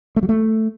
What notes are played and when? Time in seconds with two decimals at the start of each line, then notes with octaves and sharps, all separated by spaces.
0.16 A3
0.23 F#3
0.29 A3